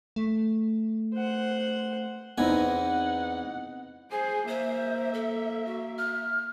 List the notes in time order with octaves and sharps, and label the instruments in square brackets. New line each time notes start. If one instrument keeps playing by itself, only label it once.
[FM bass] A3
[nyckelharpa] C5 F#5
[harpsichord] E2 E3 G#5 [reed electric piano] B3 C4 [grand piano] D#4 [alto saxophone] F#5
[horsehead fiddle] G#4 C5 [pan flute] G#5
[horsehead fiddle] A#3 E5 [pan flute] C5
[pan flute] A4
F#4
F6